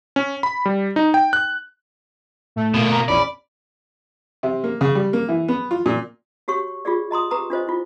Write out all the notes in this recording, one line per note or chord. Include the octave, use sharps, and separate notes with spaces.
C#4
B5
G3
D#4
G5
F#6
A2 A3
B2 A#3
A#5
A#1 E2 C#4 D5 B5
C3
A#3
C#3
G3
A#3
E3
B3
F4
A#2
F#4 G4 C#5 C#6
F4 G4 G#4 D5
D#5 A#5 C6 D#6
G4 B4 A#5 D6 D#6
D4 F4 C5 D#5
E4 F4